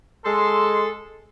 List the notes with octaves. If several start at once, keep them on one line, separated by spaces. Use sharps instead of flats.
G#3 A4 C6